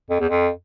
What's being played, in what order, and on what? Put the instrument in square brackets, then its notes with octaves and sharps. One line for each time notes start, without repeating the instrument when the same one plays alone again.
[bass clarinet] F2
E2
F2